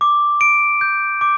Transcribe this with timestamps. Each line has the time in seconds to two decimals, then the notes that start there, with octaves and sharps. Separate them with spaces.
0.01 D6
0.41 D7
0.81 G6
1.21 D6